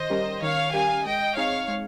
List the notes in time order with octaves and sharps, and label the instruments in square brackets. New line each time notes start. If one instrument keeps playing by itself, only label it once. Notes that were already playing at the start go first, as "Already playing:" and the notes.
Already playing: [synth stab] D#3 [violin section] C5 D#5
[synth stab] G3 C#4 G4 A#4
[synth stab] D#3 [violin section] C#5 F5
[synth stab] G3 C#4 G4 A#4 [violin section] F5 G#5
[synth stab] G#3 [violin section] D#5 G5
[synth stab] C4 D#4 G#4 [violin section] C#5 F5
[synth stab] G#3